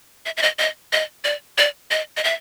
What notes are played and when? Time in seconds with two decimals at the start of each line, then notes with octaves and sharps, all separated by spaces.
0.26 E5
0.37 E5
0.42 D#5
0.59 D#5
0.93 D#5
1.24 D5
1.58 D5
1.91 D#5
2.17 D#5
2.24 E5